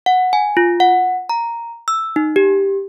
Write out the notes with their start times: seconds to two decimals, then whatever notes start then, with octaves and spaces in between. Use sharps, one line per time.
0.06 F#5
0.33 G#5
0.57 F4
0.80 F#5
1.29 A#5
1.88 E6
2.16 D#4
2.36 G4